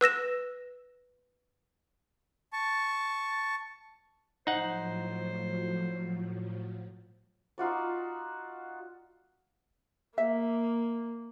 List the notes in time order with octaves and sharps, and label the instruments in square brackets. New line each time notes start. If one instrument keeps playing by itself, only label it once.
[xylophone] B4 E6 A#6 E7
[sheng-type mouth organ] A5 C#6
[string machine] A2 F3 F#3 [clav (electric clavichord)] D#4 F#5 [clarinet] C5
[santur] D#4 F4 F#4 D5
[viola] A#3 [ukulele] E5